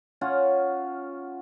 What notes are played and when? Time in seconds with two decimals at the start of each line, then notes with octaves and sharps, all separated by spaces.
0.21 C#4 F4 C#5 F#5